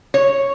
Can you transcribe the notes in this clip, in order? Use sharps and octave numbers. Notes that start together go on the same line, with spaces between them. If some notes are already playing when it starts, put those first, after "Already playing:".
C#5